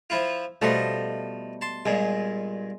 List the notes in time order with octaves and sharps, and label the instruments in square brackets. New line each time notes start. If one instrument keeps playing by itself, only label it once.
[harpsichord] F3 E4 F4
[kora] B2 G3 A3 [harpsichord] F3 D#5 C6
[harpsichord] A5 C6
[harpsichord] G2 A#2 [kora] G#3